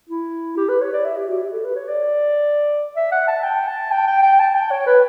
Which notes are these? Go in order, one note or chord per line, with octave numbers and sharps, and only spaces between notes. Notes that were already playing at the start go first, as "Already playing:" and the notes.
E4
G4
B4
C#5
D5
E5
G4
F#4
G4
A4
B4
C#5
D5
E5
F#5
A5
G5
A5
G5
G5
G5
A5
G5
C#5
B4